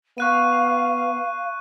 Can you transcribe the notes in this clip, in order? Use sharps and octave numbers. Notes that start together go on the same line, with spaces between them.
B3 F5 C#6 F#6 D#7